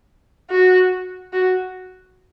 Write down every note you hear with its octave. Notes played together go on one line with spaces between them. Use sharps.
F#4
F#4